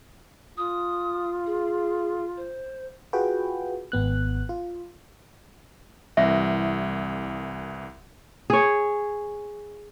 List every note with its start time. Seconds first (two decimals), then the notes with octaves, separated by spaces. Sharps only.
0.57 F4 D#6
1.46 G#4
2.37 C5
3.13 F4 F#4 G#4 B4 G5
3.92 G#1 B3 F#6
4.49 F4
6.17 C2 E3 E5
8.50 G#4 C#5